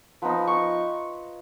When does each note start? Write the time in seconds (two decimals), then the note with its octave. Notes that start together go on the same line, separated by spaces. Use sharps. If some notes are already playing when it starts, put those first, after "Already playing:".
0.22 F3 B3 D#4
0.47 C#6